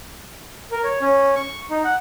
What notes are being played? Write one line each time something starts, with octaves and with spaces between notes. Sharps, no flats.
A#4
C#5
C#4
C#6
D#4
F#5